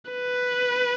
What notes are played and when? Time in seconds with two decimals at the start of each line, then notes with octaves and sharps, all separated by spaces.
0.11 B4